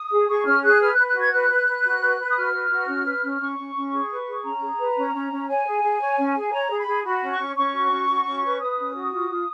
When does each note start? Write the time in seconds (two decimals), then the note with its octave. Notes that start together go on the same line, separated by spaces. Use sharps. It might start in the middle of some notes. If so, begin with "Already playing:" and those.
Already playing: D#6
0.11 G#4
0.28 G#4 C#6
0.45 C#4 F6
0.63 G#4 F#6
0.80 B4 F6
0.93 F#6
0.97 B4
1.06 F#6
1.15 F#4 G#6
1.32 B4 F#6
1.50 B4
1.67 B4
1.85 F#4
2.01 B4
2.19 B4
2.30 D#6
2.36 F#4 F6
2.53 B4
2.71 F#4
2.88 C#4
3.05 B4
3.23 C#4
3.40 C#4 C#6
3.58 C#4
3.75 C#4
3.91 G#4
4.09 B4
4.27 G#4
4.43 C#4 A#5
4.61 G#4
4.78 B4
4.96 C#4
5.14 C#4
5.31 C#4
5.48 C#5 G#5
5.66 G#4
5.82 G#4
6.00 C#5
6.17 C#4
6.35 G#4
6.52 C#5 A#5
6.69 G#4
6.78 B5
6.86 G#4
7.04 F#4 B5
7.21 C#4
7.30 C#6
7.39 C#4
7.56 C#4 C#6
7.73 F#4
7.91 C#4
8.08 F#4
8.25 C#4
8.43 B4
8.60 B4 D#6
8.77 C#4
8.95 F#4
9.12 F4
9.29 F4